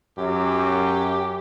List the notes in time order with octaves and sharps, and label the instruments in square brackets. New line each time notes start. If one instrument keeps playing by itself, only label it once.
[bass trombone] F#2 [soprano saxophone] G4